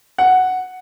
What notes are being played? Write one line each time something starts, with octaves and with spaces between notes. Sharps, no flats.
F#5